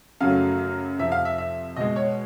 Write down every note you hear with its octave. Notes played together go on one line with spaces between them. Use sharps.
F#2 C#3 F#3 A3 F5
F2 C3 F3 E5
F5
E5
E5
B2 G#3 D#5
C#5